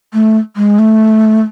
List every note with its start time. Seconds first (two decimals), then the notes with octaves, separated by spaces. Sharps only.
0.14 A3
0.57 G#3
0.79 A3